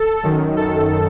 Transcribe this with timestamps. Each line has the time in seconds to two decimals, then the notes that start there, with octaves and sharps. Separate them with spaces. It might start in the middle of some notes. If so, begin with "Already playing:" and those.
Already playing: A4
0.23 F#2 D#3
0.57 A4